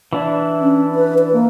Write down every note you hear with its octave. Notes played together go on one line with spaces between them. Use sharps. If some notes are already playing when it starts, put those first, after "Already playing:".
E3 D4 E4
C#4
B4
B4
A#3